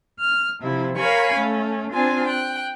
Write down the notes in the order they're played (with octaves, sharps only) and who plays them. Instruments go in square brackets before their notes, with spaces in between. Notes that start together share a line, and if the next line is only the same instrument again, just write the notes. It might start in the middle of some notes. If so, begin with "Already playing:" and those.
[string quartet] F6
C3 F3 E4
A#4 C#5 F5 G#5 B5 C#6
A3 C#4
C4 D4 F4 G#5
G5 F#6